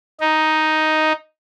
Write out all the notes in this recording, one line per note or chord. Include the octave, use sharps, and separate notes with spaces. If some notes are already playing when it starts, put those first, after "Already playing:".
D#4